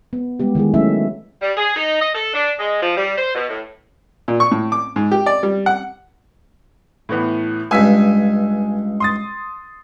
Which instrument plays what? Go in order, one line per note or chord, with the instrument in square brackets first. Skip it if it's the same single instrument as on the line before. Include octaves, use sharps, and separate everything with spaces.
[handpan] B3
G3 G#3 B3 G4
D#3 E3 G#3 G#4
F#3 A3 C#4 E4 E5
[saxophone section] G3
G#4
D#4
D#5
A4
D4
G#3
F3
G3
C5
B2
A2
[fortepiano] A#2
C#6
A2
D6
G#2
G4
D5
G3
F#5
[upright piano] A2 E3 B3
[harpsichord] C#2 G2 [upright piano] G#5 E6 B6
[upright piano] C6 D#6 A6